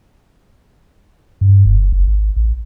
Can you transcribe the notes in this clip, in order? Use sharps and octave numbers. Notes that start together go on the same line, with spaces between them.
G2
F#1
F#1
G#1
A1